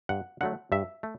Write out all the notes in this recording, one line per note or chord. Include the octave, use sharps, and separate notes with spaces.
G2 F#5
D3 F#3 A3 F#5
G2 E5
A3